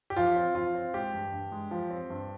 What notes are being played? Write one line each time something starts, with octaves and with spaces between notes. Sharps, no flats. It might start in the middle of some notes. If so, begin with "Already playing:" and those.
G4
F3 F4
C4
F3 F4
C4
G#3 G4
G2
G2
G#3
F3
C4
G2